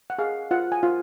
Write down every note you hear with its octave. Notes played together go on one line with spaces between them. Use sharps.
F#5
G#4 F5
F4 F#5
G#5
F4